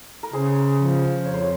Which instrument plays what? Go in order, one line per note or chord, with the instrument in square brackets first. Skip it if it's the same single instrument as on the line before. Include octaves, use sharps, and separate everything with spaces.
[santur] A#4
[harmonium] C#3 [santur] G#4 C5
[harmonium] F3
[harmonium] F2 [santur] C#5
[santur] C5
C#5